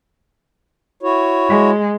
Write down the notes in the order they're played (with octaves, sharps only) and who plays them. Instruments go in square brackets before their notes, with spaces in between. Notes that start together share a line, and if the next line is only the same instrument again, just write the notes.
[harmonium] E4 F#4 C#5
[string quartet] G#3